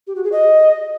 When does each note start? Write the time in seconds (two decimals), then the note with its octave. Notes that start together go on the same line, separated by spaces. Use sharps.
0.07 G4
0.15 F#4
0.24 G#4
0.32 D#5